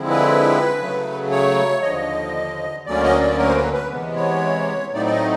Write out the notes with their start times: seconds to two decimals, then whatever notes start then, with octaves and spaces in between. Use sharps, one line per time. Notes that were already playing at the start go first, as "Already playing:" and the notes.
Already playing: D3 F3 G#3 C4 E4
0.10 B4
0.79 C#3 F#3 A3
1.31 C#5
1.83 D#2 D3 F3 D#5
2.86 D2 D3 F#3 A#3 C#4 D5
3.04 D#5
3.21 D5
3.38 A#4
3.49 C5
3.56 B4
3.73 B4
3.90 C3 E3 G#3 B3
4.16 C#5
4.94 A2 F#3 A3 C4 D#4 D5
5.06 D5
5.11 D#5